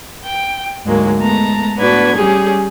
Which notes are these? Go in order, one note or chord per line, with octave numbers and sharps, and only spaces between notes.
G5
D2 G#2 F#3 G#3 A#3
G#3 A3 B3 A5 A#5
A2 B3 D4 F#4 B4 G#6
G3 C#4 G4 G#4